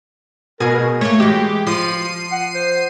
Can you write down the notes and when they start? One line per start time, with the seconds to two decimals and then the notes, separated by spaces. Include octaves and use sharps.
0.60 B2 G#4 A#4
1.01 A3 A#3 C#5
1.20 E3 G#3 F#4 G4
1.67 F3 F4 C7 D#7
2.32 F#5
2.55 C5